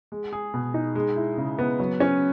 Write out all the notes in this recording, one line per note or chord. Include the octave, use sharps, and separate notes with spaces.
G#3
G#4
B2
D#4
G#3
E4
C#3
B3
F#3
C#4